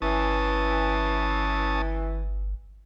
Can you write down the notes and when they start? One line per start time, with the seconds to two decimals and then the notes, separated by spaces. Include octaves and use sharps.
0.02 G1 E3 C#4 A5 D#6